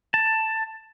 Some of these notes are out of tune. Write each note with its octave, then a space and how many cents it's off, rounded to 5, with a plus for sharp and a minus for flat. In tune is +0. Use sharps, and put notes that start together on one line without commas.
A5 +10